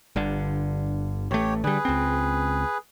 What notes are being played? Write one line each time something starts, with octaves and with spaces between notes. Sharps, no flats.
G1 G2 D3
A1 A3 G4 C#5
D3 G3 G#4 B4
C#2 C4